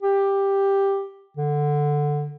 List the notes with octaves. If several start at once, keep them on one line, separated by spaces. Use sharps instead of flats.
G4
D3